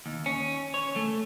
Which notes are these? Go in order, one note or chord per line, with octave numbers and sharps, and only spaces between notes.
D#2
C#4
C#5
A3